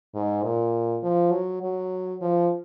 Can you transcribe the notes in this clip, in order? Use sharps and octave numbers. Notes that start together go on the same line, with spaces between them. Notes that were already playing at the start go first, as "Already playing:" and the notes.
G#2
A#2
F3
F#3
F#3
F3